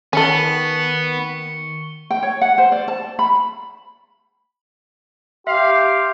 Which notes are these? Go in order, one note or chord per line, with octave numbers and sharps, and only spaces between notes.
D#3 B3 C#4 A4 C#6 C#7 G7
G5
C#5
F#5
C5
D5
A5
B5
G4 E5 F5 C6